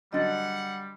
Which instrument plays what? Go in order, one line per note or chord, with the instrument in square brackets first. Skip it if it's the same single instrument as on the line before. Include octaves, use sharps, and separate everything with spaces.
[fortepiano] D3 F#3 [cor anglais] G3 [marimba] D#5 A6 [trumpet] F#5